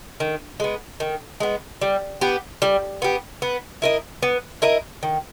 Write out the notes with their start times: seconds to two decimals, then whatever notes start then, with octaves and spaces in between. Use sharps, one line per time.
0.20 D#3
0.60 G#3 B3
1.00 D#3
1.40 G#3 B3
1.82 G3
2.21 B3 G4
2.62 G3
3.02 B3 G4
3.42 B3
3.82 E4 A#4 D#5
4.23 B3
4.62 E4 A#4 D#5
5.03 D#3